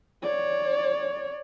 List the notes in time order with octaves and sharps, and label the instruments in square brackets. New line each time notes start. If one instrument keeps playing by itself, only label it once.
[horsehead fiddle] C#5 D5